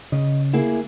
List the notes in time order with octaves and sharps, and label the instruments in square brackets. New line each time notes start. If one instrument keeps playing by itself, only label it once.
[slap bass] C#3 [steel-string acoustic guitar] D#5
[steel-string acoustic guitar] A#3 E4 G#4